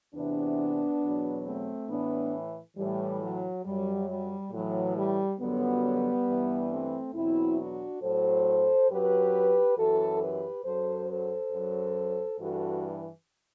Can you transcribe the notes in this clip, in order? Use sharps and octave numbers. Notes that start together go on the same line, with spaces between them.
E2 C3 E3 B3 D4
E2 B2 F#3
A3 C4
A2 E3 B3 D4
A2 E3 G3
F#3
F#2 F#3 G3
G3
A2 E3 F#3
G3
F#2 D3 F#3 G3 B3
G2 E3
A3 C4
E2 B2 F#3 C4 E4
D4 F#4
A2 F#3 A4 C5
F#2 F#3 G4 B4
F#2 E3 F#4 A4
G4 B4
F#2 F#3 A4 C5
A4 C5
F#2 F#3
G2 E3 F#4 A4